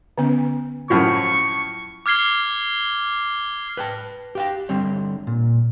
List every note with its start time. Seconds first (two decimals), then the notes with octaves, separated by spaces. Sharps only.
0.18 D3 B3 C#4
0.90 F#2 A2 F3 C#6
2.06 D6 F6 G#6 C7 G7
3.77 B4 G5 A5
4.35 G4 F5 G5
4.69 D3 G3 C4 C#5
5.27 A#2